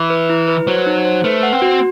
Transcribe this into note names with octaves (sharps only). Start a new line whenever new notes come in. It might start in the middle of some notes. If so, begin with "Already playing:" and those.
Already playing: E3
B4
E4
B4
F#3 C5
D#4
C5
A3 B4
F#5
C4
F#4